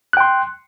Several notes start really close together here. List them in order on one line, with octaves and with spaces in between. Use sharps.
F#6 G5 C6